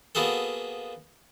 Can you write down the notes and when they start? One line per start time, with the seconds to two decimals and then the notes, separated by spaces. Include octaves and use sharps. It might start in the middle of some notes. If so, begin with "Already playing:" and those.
0.15 A#3 B3 F#4 G#4 A4